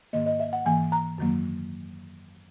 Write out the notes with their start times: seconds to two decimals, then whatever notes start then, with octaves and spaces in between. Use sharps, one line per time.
0.13 G#2 D#3 A#3 D#5
0.26 D#5
0.40 E5
0.53 F#5
0.66 G#2 E3 A#3 G#5
0.92 A#5
1.18 F#2 D#3 F#3 A#3